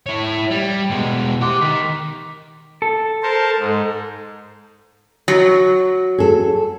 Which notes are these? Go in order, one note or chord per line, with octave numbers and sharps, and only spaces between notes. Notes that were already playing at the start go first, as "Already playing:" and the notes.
E4 C#5
G3 G#6
B2 G#3
G4 C6 D6 F#6
D#3 B6
A4
A#4 C5 A5
G#2
F#3
G#4 A4